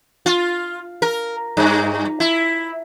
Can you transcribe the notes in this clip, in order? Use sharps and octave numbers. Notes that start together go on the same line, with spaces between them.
F4
A#4
G2
E4